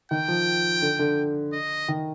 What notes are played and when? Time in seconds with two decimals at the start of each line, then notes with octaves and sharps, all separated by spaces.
0.11 D#3 G5
0.28 F3
0.82 D3
0.99 D3
1.53 D#5
1.88 D#3